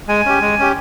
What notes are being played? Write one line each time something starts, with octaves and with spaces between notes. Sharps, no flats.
G#3 G#5
C#4 G4
G#3
C#4 G4